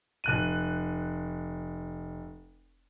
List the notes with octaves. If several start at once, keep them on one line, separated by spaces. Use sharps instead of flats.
F1 F#6 D#7